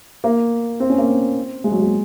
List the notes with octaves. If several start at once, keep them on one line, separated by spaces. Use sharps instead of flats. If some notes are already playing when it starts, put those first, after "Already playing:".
A#3
C4
C#4
A#3
C4
G#3
F#3
G#3